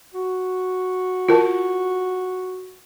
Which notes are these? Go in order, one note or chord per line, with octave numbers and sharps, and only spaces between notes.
F#4
F4 A#4 A5